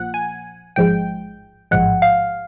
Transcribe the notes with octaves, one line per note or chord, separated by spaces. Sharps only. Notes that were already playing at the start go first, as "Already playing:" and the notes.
Already playing: A#1 A#2 F3 F#5
G#5
A1 G#2 F3 G#3 G5
A1 G#2 F3 G#3 F#5
F5